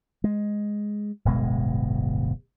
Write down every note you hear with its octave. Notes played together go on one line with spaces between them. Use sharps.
G#3
D1 G1 B2 G#3